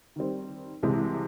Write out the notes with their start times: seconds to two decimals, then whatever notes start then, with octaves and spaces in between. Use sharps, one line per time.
0.16 D#3 G3 C4
0.82 C2 C3 E3 G#3